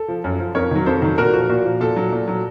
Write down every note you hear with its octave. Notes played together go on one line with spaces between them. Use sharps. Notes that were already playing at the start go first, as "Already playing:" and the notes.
Already playing: A4
F3
F#2
F3
F2 A#4 C#5
D#3 F#3
F2 A4 C5
D#3 F#3
A#2 F#4 A#4
F3 F#4
A#2 F#4
F3
A#2 A4
F#3
A#2
F#3